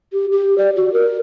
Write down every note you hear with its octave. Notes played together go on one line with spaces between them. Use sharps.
G4
G4
D5
F#4
A#4